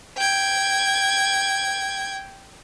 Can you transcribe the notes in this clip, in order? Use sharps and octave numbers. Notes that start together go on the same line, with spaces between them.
G5 G#6